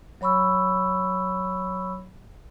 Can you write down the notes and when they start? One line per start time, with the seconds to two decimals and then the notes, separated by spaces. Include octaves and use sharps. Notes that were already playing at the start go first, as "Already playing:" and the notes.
0.21 F#3 C#5 B5 C#6 E6